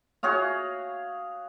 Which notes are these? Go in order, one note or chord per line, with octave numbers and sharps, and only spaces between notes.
F#4 G#4 C#5 F5